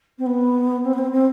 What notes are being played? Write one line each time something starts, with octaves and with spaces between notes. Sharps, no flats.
C4
B3
C4
B3
C4
C4